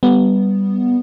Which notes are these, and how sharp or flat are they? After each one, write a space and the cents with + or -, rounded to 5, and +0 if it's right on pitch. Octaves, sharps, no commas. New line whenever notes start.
G3 +0 B3 +0